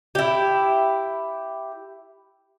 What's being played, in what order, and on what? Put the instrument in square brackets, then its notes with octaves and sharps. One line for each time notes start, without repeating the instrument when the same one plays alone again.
[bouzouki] E4 G4